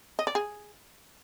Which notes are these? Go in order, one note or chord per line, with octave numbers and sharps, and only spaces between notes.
D#5
D5
G#4